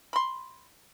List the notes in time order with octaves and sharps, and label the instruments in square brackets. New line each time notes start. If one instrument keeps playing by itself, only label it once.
[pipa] B5 C6